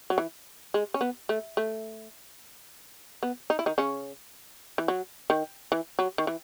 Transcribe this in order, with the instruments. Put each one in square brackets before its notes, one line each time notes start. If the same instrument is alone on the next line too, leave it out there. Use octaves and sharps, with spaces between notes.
[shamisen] F#3
E3
G#3
C#4
B3
A3
A3
B3
D#4
E4
D#3 D#4
C#3 C#4
E3
F#3
D#3
E3
F#3
D#3
E3